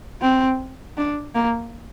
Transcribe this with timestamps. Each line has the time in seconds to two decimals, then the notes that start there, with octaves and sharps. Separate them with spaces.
0.21 C4
0.97 D4
1.35 A#3